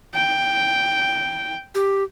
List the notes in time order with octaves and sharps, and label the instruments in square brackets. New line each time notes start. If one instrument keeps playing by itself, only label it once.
[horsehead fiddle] G5
[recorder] G4